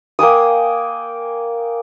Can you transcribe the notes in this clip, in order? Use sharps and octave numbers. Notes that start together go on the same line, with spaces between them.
A#3 G5 G#5 D#6